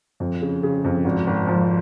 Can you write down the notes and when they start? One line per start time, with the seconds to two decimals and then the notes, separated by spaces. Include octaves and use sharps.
0.20 F2
0.42 C#3
0.63 C#3
0.84 F2
1.05 G#1
1.27 G#1
1.47 F3